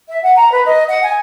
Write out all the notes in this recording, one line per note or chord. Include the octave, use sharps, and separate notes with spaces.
E5
F#5
A#5
B4
D#5
F#5
G#5